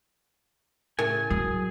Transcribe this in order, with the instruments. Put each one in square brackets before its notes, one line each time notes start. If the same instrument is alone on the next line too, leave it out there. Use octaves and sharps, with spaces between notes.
[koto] A2 C#3 [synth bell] A#4 [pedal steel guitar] G#5
[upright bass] F#3 [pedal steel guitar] G#4